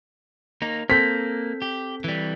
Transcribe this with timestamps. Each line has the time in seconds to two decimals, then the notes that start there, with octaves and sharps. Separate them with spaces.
0.62 A#3 D#4
0.90 A#3 C4 A4 G6 B6
1.62 G4
2.04 E3 G3